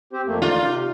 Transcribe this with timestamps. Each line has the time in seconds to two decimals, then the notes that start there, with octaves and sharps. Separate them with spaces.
0.13 C4 G4 C5
0.26 F2 A3 A#3
0.42 D#4 F4 D5
0.64 C3